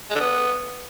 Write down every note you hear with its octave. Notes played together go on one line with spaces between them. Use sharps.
G#3
D3
B3